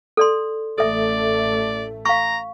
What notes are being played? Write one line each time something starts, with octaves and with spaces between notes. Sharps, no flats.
A4 D5 C6
A1 A3 A4 D5 E5
F5 A#5 C#6